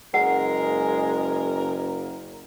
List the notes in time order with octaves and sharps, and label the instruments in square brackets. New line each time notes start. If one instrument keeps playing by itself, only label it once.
[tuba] F#1 [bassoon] G#3 [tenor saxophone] A#4 [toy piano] F#5